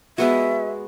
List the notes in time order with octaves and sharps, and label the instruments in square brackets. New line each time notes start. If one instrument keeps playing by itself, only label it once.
[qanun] G#3 B3 F#4 [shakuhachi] E5